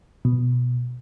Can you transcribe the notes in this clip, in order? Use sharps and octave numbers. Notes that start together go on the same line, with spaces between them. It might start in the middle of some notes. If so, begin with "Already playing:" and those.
B2